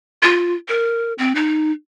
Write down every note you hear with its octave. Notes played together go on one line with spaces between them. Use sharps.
F4
A#4
C4
D#4